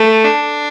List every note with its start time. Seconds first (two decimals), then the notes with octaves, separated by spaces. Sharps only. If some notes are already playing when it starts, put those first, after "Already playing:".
Already playing: A3
0.25 D4